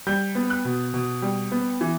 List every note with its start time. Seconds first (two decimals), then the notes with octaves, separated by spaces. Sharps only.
0.07 G3 G6
0.35 B3
0.50 F#6
0.65 B2
0.94 B2
1.22 G3
1.51 B3
1.81 E3